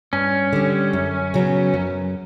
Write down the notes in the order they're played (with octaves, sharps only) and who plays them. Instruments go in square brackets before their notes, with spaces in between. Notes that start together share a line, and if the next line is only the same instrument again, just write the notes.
[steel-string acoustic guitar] G2 [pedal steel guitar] C#4
[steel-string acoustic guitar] D3 G3
F#2
C#3 F#3 B3
F#2